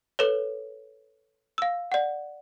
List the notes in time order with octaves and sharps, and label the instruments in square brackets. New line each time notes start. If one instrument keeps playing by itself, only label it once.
[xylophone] A4 B4 C#5
F5 E6
D5 F#5